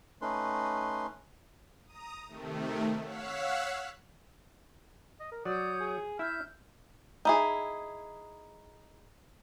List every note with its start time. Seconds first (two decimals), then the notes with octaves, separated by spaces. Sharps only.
0.22 A3 C#4 D#4 B4 C6
1.86 A#5 D#6
2.28 C3 D#3 A3
3.02 C#5 F5 F#5 E6 F#6 B6
5.20 D#5
5.32 A#4
5.45 F#3 C#5 D5 D#6 G6
5.80 G#4
6.19 E4 E5 F6 G6
7.25 D#4 E4 G#4